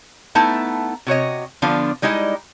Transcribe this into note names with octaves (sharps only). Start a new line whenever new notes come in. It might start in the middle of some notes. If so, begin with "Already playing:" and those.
A3 B3 D#4 E4 A5
C3 F#4 C#5 D#5
D3 F3 B3 D4 F4
G3 G#3 D#4 E4 D#5